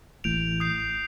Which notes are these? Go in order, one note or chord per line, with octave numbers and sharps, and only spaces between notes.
A1 A2 G6 D7 F7
D#6 G6 C7